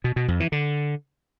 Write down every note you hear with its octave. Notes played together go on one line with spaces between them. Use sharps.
B2
B2
F2
E3
D3